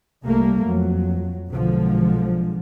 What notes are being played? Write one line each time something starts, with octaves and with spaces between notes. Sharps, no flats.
C2 G3 A3 A#3
F2 F#3
B1 D3 F3 G#3